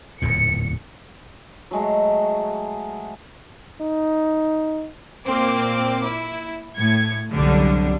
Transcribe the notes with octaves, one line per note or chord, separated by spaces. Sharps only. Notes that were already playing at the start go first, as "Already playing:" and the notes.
D1 E2 A#2 C#7
F#3 G#3 A3
D#4
A#2 A#3 C4 D6
E4
A2 G#6 C#7
C2 F#2 B2 D3 F#3 G3